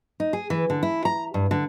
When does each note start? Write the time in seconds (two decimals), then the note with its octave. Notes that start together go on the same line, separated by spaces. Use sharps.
0.20 D#4
0.33 G#4
0.50 E3
0.70 D3
0.83 E4
1.05 A#5
1.34 G2
1.51 D3